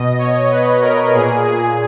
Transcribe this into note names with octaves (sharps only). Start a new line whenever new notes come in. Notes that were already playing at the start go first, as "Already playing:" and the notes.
Already playing: B2 D#5
C#5
B4
A#4
A#2 G#4
G#4